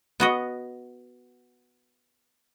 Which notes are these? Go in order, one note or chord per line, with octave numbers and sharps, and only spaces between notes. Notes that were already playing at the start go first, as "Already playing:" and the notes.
B3 F#4 D#5